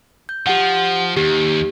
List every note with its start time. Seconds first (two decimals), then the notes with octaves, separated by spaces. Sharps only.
0.29 G6
0.47 F3 G4 F#5
1.17 D#2 G4